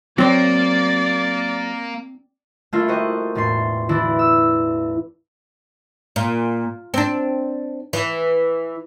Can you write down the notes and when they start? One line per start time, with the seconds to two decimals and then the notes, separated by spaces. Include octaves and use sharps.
0.18 F#3 A#3 C4 C5 D5
2.73 A3 A#3 D4 E4 F4 A#4
2.88 F#4 C5 D#5 G5
3.35 E1 A2 D4 C6
3.89 E3 D4 E4
4.19 E6
6.16 A#2
6.94 C4 D4
7.93 E3